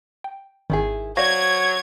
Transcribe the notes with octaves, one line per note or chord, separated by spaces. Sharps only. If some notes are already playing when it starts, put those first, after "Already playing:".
G5
G#1 D#3 E4 G#4
F#3 C5 D5 F5 C#6 G#6 A#6